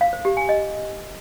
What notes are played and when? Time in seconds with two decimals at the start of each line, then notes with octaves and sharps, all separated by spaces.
0.01 F5
0.13 C5
0.25 G4
0.37 G#5
0.49 D#5